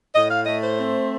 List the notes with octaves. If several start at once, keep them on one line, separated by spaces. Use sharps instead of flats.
A2 D#5
F5
A3 D#5
C5
C4